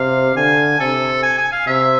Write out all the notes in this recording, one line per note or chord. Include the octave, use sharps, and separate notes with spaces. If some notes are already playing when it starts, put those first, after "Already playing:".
Already playing: C3 F5
D3 G#5
C3 A4
G#5
G#5
F5
C3 E5